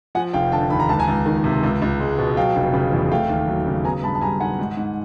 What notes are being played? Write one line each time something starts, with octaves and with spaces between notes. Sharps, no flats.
F3 F#5 G#5
F1 F5 G5
D3 G5 A5
D#2 B5
A#5
C#2 A5
G#5 A#5
C#2
D#3
C3
C#2
C#2
G#3
B2
F#3 F5 G5
F1
C#3
E2
A3 F5 G5
D#2
F#3
C#3
B3 G#5 A#5
G2 A5 B5
A5
G3 G#5 A#5
D#3 F#5 G#5
G#2
G#2